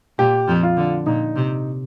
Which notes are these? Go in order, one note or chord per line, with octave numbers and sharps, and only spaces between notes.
A#2 G4
F2 F3
F4
D3
A#2 D#4
C3